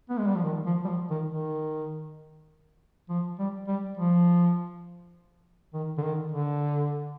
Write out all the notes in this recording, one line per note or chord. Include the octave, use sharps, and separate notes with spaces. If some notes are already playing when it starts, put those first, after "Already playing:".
B3
G#3
G3
F3
D#3
F3
G3
F3
D#3
D#3
F3
G3
G3
F3
D#3
D3
D#3
D3